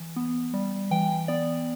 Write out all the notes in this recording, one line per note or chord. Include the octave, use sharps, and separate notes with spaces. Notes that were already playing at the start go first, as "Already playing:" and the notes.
Already playing: E3
B3
G3
E3 G5
B3 D5